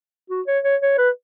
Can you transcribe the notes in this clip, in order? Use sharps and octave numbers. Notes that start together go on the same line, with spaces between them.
F#4
C#5
C#5
C#5
B4